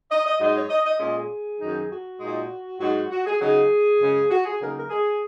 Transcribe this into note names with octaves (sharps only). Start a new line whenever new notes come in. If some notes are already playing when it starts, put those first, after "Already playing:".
D#5
D#5
G#2 F#3 D#4 D#5
C#5
D#5
D#5
A#2 G#3 C#4 D#5
G#4
F#2 D#3 F#3 D#4
F#4
A#2 G#3 D#4
G#2 F#3 D#4 F#4
F#4
G#4
C#3 F#3 D#4 G#4
F#2 C#3 G#3 C#4
F#4
G#4
C#3 F#3 A#3 D#4 A#4
A#4
G#4